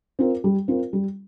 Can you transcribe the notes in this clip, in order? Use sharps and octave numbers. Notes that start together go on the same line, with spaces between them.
C4 F4 A#4
G3
C4 F4 A#4
G3